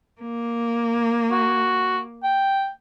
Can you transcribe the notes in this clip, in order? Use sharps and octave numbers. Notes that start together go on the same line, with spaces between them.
A#3
F#4
G5